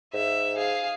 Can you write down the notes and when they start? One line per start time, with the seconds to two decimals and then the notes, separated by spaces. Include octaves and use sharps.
0.14 G#2 E5
0.55 G#4 F5